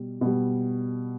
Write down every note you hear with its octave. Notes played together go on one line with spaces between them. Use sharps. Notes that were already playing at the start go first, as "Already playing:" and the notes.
Already playing: B2 G3
B2 G3